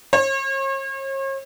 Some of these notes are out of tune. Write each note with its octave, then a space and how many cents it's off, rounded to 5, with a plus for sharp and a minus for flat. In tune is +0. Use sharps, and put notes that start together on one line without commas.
C#5 -45